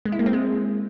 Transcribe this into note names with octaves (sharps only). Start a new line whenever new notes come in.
G#3
E4
A#3
C4
G#3